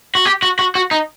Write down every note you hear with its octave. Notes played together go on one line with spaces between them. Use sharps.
F#4
G4
F#4
F#4
F#4
D#4